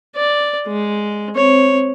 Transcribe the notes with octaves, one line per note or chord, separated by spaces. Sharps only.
D5
G#3
C4 C#5